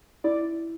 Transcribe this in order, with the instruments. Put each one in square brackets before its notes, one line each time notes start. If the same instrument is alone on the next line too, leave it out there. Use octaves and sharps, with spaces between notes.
[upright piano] E4 [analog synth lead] D5